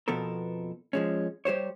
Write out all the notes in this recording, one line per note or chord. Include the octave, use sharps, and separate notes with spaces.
F2 B2 F3 B3 A4 A#4
F3 G#3 C#4
G3 G4 C5 C#5